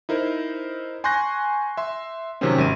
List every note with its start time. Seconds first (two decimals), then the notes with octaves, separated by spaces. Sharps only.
0.09 D#4 E4 A#4 C5
1.04 G#5 C6 C#6 F#6 G6 A#6
1.77 E5 C6
2.41 C3 D#3 F3 F#3 C4 C#4
2.58 G#1 D#7